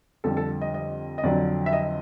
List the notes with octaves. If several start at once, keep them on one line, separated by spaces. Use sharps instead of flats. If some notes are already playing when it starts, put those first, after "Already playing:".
F2 D3 G3 A4
A4
D#5
D#5
D#5
F2 D3 F#3 D5
E5
D#5